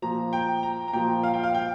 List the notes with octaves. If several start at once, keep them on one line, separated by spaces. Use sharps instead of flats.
A#2 F3 A#5
G5
A#5
A#5
A#2 F3 G5
F5
G5
F5
G5